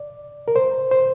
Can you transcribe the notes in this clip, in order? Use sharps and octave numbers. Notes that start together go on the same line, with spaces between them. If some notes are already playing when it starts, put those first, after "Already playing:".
Already playing: D5
A#4
C5
C5